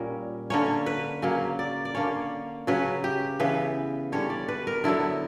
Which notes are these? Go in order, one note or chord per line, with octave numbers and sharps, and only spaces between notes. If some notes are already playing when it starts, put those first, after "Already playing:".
Already playing: A#2 G3 C#4 A#4
D3 A#3 C#4 C#5
B4
C#3 F#3 A#3 C#4
D5
D5
D3 A#3 C#4 C#5
C#3 F#3 C#4 B4
G4
C#3 E3 B3 B4
D3 G3 C#4 C#5
D5
B4
A#4
D3 F#3 B3 E4